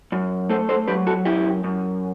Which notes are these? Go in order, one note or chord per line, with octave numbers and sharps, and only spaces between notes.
F#2
A3 A4 C5
A4 C5
F#3 G4 B4
F#4 A4
F#2 E4 G4
F#2